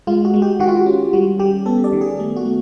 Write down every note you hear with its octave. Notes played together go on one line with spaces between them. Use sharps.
G#3 F4
F#4
G#3
G4
D#3 F#4
F4
F#4
C#4
G3 F#4
G3 G4
B3 A4
D5
D#3
G#4
A3
F#4
A3